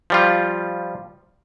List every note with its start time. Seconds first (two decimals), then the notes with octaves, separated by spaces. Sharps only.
0.10 F3 G3 F4